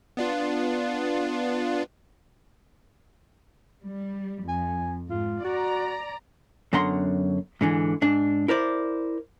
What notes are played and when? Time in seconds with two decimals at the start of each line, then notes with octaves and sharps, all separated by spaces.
0.17 B3 D4 F4
3.85 G3
4.48 F2 G#5
5.10 G#2 F4
5.44 F#4 D5 A#5
6.73 F#2 D3 B3 F#5 A#5 C6
7.61 G#2 D3 E3
8.02 G#2 D4
8.48 E4 A#4 C5 D5